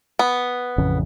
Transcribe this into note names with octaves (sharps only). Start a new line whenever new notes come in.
B3
A1 F2 C#3